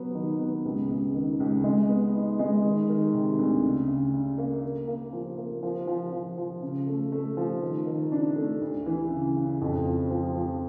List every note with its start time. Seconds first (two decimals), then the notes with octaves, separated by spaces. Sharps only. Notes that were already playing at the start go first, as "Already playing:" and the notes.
Already playing: F#3 B3
0.15 D#3
0.39 B3
0.65 C#2
0.90 C#2
1.14 D#3
1.40 C#2
1.64 G#3
1.89 B3
2.14 D#4
2.39 G#3
2.65 D#3
2.89 D#3
3.14 C3
3.39 D2
3.64 C#3
3.88 C#3
4.14 C#3
4.38 A#3
4.63 A#3
4.87 A#3
5.13 F3
5.37 A#3
5.63 F3
5.87 F3
6.12 F3
6.38 F3
6.62 C#3
6.87 A3
7.12 A3
7.37 F3
7.62 D#3
7.87 D#3
8.12 D4
8.36 A3
8.61 D2
8.86 E3
9.11 C#3
9.36 C#3
9.61 F2
9.86 F3
10.10 F3
10.36 F3